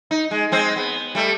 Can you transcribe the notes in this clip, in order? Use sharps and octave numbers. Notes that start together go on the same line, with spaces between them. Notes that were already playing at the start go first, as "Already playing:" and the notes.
D#4
G#3
G#3 C4 C5
B3
G3 A3